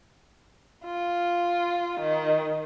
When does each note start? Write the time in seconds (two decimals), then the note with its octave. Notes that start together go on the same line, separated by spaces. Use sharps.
0.85 F4
2.00 D#3